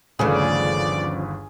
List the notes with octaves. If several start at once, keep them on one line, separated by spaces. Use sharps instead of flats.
G1 D#2 C#3 F3 A3 G#4 B4 D5